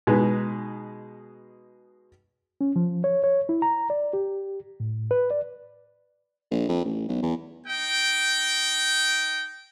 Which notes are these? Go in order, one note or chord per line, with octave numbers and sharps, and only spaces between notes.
B2 G#3 D#4 B4
C#4
F3
C#5
C#5
E4
A#5
D5
G4
A2
B4
D5
A#1
F2
A1
B1
E2
D#4 G5